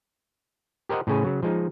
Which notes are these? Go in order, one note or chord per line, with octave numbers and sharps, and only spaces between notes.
G4 A#4 C5 D#5 F#5
A2 C#3 C#4 G#4
C#3 F#3
F3 G#3 D#4